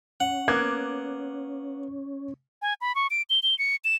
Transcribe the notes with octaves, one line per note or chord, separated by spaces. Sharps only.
C#4 F#5
A#3 B3 D6 F#6 G#6
G#5
B5
C#6
D7
G7
G7
C#7
E7